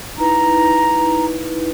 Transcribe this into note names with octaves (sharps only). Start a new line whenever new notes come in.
D#4 E4 B4 A#5